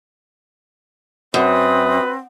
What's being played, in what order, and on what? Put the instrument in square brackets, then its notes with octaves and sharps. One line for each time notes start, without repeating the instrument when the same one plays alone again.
[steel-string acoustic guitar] F#2 [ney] C4 [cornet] B4 [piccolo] D#6